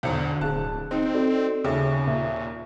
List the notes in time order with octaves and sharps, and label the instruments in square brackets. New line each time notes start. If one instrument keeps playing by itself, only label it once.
[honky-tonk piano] B1 E2 B2 [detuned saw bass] D3 [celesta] D4 C5 C#7
[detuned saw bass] D1 [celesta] G#4 F5 F#6 [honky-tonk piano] A5
[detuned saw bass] C4 [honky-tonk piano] D#4
[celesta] F#4 A4 D5
[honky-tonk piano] D#2 [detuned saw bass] C#3 [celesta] G#4 E5
[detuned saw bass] A#2 [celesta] E5